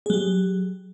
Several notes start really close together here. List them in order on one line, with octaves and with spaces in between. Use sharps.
G#4 F#3 G4